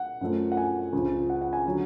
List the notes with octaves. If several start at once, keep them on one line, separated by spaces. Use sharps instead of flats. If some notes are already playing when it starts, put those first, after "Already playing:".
Already playing: F#5
F#2 F3 A3
F#5
G#5
C#2 C#3 F3
F#5
F#5
G#5
D3 F#3